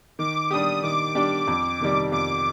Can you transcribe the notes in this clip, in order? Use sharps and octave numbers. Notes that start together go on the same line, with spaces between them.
D#3 D6
G3 D4 G4 D#6
D#3 D6
G3 D4 G4
F2
C3 D#3 G3
F2 D6